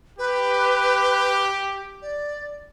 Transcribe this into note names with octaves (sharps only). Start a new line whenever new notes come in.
G4 B4
D5